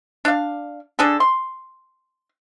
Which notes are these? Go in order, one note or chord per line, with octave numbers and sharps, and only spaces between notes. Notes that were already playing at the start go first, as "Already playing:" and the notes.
D4 F5
D3 D4 G#4 A4
C6